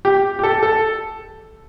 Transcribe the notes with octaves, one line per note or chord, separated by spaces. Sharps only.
G4
G4
A4
A4